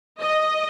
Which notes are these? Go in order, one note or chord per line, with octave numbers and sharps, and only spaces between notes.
D#5